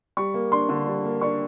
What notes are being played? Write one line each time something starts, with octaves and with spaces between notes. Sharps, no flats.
G3 C#6
A#3
D4 C6
D3
G3
A#3
D4 C#6